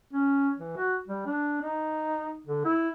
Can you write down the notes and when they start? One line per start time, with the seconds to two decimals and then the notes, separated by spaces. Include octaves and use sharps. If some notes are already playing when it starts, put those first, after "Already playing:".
0.13 C#4
0.58 E3
0.77 F#4
1.08 G3
1.26 D4
1.62 D#4
2.47 D3
2.65 E4